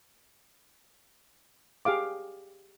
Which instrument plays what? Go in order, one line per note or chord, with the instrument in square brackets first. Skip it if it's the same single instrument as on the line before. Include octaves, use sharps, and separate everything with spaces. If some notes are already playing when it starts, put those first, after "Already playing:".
[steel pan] G4 G#4 F5 D6